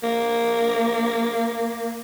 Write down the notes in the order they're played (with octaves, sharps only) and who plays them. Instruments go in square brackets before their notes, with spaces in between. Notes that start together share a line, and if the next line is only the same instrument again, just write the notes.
[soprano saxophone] A#3